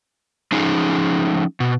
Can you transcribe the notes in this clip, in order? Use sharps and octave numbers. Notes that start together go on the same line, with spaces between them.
F3 A3 C#4 D#4 G#4
B2